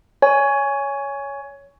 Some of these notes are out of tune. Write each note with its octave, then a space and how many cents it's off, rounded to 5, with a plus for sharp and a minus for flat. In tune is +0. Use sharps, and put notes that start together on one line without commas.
C#5 +15 G#5 +0